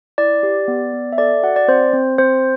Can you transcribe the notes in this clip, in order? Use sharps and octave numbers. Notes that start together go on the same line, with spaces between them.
E4 D5
G4
B3
B3
E5
A4 D5
F#4 F#5
D5
C4 C5
C4
C4 C5